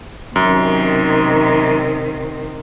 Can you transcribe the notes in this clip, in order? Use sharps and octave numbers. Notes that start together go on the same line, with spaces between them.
F#2 C3 D#3